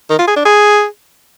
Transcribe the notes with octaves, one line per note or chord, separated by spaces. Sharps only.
D#3
F4
G#4
D4
G#4